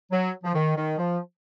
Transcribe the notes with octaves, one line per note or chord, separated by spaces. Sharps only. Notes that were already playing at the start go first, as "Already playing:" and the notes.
F#3
F3
D#3
D#3
F3